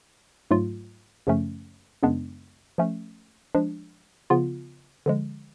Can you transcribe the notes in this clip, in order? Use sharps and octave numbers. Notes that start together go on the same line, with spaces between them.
G#2 F#3 A3 F4
F#2 C#3 F3 A3 C#4
F#2 C#3 G#3 B3 D4
F3 A3 C#4
F3 G#3 D4
C#3 F3 B3 F4
D3 F3 G#3